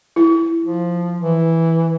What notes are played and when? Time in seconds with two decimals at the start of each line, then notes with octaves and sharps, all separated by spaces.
0.16 E4
0.65 F3
1.21 E3